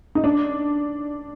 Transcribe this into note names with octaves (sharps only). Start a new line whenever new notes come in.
D#4
D4